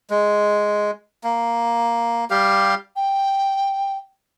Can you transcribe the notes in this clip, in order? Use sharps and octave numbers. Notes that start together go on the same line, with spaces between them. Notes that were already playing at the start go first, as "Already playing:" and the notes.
G#3
A#3
G3 G4 F5
G5